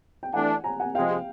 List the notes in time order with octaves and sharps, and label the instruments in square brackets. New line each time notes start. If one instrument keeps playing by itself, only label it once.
[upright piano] G5
[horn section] E3 A3 D4 [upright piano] F#5 G#5
[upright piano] G#5 A#5
F#5 G#5
[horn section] C3 F3 G#3 [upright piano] F5 G5